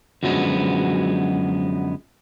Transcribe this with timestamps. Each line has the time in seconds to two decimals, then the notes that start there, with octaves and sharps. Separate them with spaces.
0.23 F#2 D3 F3 F#3 G#3 B3